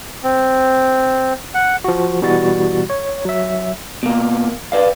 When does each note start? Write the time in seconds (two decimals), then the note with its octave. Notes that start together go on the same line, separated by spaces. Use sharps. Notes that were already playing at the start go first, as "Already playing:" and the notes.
0.24 C4
1.54 F#5
1.84 F3 F#4
2.22 B2 E3 G3 F#4 A6
2.90 C#5
3.25 F#3 E5
4.03 B2 A#3
4.72 B4 D5 F5